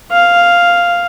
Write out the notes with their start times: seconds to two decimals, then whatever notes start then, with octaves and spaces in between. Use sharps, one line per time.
0.12 F5